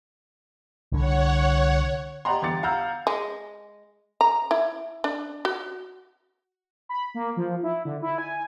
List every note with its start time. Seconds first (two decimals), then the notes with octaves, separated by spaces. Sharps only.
0.92 C2 D3 C#5 F#5
2.25 G4 D5 D#5 F#5 A#5 C6
2.42 G1 E2 G4 D6 A6 C#7
2.63 F5 F#5 A#5 E6 F6 G6
3.07 G#3
4.21 A#5
4.51 E4
5.04 D4
5.45 F#4
6.89 B5
7.14 A#3
7.37 F3
7.63 E4
7.85 D3
8.02 E4
8.18 G#5